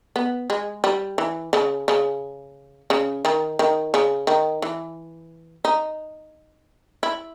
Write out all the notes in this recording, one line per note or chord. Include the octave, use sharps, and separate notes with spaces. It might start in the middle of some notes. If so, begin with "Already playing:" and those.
B3
G#3
G3
E3
C#3
C#3
C#3
D#3
D#3
C#3
D#3
E3
D#4
E4